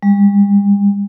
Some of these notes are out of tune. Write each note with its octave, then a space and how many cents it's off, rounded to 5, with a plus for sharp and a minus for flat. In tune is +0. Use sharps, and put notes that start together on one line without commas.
G3 +45